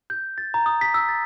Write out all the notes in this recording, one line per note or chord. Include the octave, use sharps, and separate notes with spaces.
G6
A6
A#5
D#6
B6
E6
A6